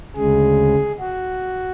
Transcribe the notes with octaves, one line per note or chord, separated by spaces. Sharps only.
D2 C#3 G#3 G#4
F#4